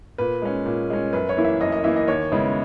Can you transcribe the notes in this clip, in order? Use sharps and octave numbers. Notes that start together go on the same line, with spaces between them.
A#2 B4
G#3 C#4
A#2
G#3 C#4
F#2 B4
C#5
E3 A#3 E4
E5
F#2 D#5
D#5
E3 A#3 E4 E5
D#5
D#2 C#5
C#3 G#3 B3 E4